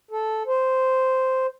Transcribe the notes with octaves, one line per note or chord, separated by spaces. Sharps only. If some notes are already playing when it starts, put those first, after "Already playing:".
A4
C5